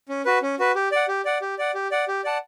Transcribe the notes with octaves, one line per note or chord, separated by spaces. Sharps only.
C#4
F#4 B4
C#4
F#4 B4
G4
D5 F#5
G4
D5 F#5
G4
D5 F#5
G4
D5 F#5
G4
D5 F#5 A5